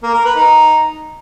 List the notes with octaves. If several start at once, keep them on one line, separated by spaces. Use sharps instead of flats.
A#3
A#4
B4
D#4